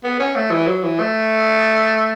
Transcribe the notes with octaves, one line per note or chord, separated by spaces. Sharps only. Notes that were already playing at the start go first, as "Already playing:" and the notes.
B3
C#4
A3
E3
F#3
E3
A3